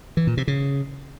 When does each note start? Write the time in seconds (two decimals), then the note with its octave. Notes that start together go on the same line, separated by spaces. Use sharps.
0.17 E3
0.27 A#2
0.37 C3
0.48 C#3